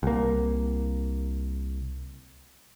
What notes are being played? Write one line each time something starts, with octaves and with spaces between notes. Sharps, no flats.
C2 A#3